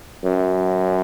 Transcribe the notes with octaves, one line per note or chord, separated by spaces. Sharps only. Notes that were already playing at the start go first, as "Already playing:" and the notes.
F#2